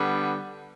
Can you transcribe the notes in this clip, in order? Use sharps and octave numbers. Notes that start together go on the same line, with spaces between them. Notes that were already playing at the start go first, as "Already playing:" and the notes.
Already playing: D3 G3 B3